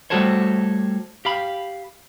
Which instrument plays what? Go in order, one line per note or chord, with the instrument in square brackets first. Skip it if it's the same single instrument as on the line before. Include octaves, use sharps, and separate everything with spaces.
[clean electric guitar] G3 A3 F#4 A4 C5 C#5
G4 F5 B5